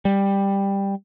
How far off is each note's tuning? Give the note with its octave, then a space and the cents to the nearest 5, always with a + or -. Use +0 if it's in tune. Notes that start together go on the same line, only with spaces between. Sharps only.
G3 +10